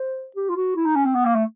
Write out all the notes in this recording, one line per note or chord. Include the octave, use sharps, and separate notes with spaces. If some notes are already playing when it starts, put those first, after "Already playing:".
Already playing: C5
G4
F4
F#4
E4
D#4
C#4
C4
B3
A#3
A3